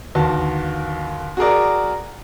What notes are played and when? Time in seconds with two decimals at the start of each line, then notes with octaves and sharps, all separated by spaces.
0.15 G1 D#2 F#4 A5
1.37 F#4 G#4 A#4 D5